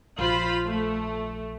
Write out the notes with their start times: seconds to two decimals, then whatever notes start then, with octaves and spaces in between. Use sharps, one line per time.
0.19 A#1 F4 C5 B5
0.67 A3